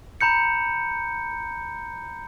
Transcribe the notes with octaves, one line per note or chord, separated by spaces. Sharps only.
A#5 B5 G6 C#7